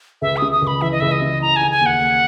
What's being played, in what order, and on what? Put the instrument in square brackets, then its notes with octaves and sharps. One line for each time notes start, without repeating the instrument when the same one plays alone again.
[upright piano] C#2 [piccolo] E5
[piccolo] D#6
[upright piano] C#3
[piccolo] D#6
[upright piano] C#2
[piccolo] B5
[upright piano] E3 [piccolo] E5
[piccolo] D#5
[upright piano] C#2 [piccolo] E5
[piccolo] D#5
[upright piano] C#3
[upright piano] E4 [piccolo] A#5
[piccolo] G#5
[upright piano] D#3
[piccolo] G#5
[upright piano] D#2
[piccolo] F#5
[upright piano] A#3